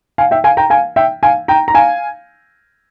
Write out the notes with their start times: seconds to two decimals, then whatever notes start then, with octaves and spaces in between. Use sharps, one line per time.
0.18 F5 G#5
0.31 E5 G5
0.44 F5 G#5
0.57 G5 A#5
0.70 F5 G#5
0.96 E5 G5
1.23 F5 G#5
1.48 G5 A#5
1.68 A#5
1.74 F5 G#5